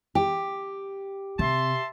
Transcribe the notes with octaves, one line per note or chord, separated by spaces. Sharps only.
G4
C3 E5 A5 C6